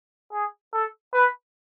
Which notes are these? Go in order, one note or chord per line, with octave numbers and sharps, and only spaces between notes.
G#4
A4
B4